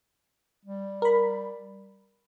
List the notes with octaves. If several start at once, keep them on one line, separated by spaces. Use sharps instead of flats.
G3
A#4 B5